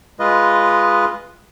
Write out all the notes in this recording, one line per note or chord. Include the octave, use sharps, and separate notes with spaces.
G#3 F4 B4 D#5